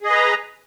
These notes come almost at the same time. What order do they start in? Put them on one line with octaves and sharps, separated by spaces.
G#4 D#5 B4 A#5